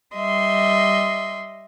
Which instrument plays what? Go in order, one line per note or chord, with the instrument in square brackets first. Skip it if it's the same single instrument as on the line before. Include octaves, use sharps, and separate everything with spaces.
[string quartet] G3 D#5 E5 C6